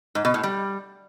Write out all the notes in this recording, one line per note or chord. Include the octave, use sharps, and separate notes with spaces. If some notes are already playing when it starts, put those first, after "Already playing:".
G#2
B2
A2
G3